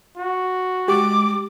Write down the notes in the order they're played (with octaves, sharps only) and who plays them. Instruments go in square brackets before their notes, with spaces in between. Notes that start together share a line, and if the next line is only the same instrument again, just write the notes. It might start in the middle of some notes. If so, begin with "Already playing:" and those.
[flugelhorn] F#4
[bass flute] G#3 [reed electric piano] G4 [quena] D6